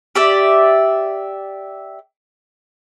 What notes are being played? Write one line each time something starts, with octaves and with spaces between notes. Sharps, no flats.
G4 D5 E5